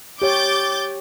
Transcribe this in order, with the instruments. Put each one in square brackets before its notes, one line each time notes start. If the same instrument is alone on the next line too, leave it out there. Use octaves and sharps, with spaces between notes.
[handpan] G4 C#5 [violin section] D6 G6 A6